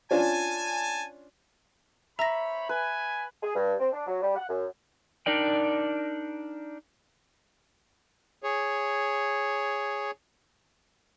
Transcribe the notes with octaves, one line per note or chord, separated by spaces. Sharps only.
C#4 D4 F4 G#5 A5
C4 C#5 E5 A#5 B5 A#6
B4 G#5
G#4
G2
C4
D4
F#3
G3
F#5
F#2
D4 D#4 A#4 D5 G5
G#4 C#5